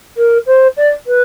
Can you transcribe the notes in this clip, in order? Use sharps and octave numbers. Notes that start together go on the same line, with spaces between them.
A#4
C5
D5
B4